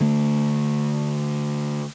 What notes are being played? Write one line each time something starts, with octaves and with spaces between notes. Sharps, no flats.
D3 A3